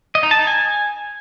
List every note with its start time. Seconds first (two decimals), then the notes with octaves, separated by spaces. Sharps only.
0.15 D#5
0.23 D#4
0.31 A5
0.39 D#4
0.47 G#5